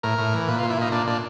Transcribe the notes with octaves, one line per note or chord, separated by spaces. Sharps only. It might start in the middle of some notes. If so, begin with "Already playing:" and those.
A2 A#4
A2
E3
A#2 B4
F4
A#2
E4
A#2 D#4
A#2 D4
A#2 D4